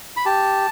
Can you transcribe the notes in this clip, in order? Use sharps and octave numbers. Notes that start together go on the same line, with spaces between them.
B5
G4 A5